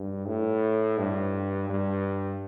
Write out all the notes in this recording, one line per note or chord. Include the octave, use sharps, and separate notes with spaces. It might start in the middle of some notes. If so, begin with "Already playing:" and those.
Already playing: G2
A2
G2
G2